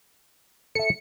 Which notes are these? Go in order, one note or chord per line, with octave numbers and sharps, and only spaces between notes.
A4 E5 C#7